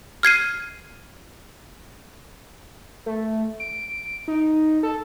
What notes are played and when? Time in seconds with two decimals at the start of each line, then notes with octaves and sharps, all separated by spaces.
0.23 F6 G#6 C7 D#7
3.06 A3
3.60 D7
4.28 D#4
4.83 A4